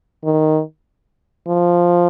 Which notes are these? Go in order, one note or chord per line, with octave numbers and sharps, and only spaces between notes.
D#3
F3